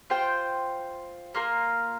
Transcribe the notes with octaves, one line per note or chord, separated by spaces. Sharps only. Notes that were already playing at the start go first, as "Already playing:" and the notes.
F4 C5 G5
A#3 F4 A#4